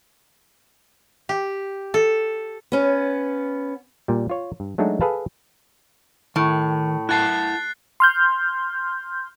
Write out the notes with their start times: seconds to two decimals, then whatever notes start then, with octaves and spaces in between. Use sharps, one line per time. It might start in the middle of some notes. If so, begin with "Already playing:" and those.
1.29 G4
1.94 A4
2.72 B3 C#4
4.08 A#2 G3
4.30 F4 C#5
4.60 G2
4.78 F#3 G#3 A3 D4 D#4 F#4
5.01 G#4 A4 B4 F5 A5
6.36 A2 D#3
7.09 E4 F#5 A5 F#6 A6 C7
8.00 C6 F6 G6